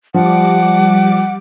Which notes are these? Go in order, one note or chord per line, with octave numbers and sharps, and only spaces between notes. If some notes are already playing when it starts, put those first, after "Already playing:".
F3 G3 F#5 D6